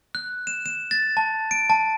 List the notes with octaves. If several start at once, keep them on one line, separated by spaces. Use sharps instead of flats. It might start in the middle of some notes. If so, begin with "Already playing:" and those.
F#6
E7
E7
A6
A5
D7
A5